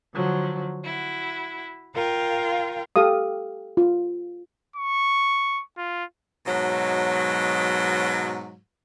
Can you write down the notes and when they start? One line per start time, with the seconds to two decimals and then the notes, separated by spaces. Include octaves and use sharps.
0.14 D3 F3 F#3
0.84 E4 F#4
1.94 F4 A#4 F5 G5
2.96 G4 A4 F5 D#6
3.77 F4
4.76 C#6
5.77 F4
6.46 G#2 B2 F#3